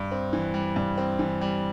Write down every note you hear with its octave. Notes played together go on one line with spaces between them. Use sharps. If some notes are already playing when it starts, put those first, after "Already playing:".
Already playing: G2
C4
E3
G3
G2
C4
E3
G3